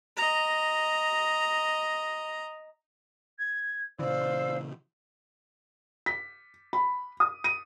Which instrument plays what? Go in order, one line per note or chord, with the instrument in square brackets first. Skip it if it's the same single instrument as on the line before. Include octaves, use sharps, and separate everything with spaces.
[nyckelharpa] D#5 A#5
[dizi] G#6
[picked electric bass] A#2 C#3 E3 [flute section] C5 F5 E6 [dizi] D5
[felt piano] B6
B5
D#6
D#7